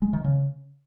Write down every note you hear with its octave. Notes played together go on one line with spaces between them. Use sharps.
G#3
D#3
C#3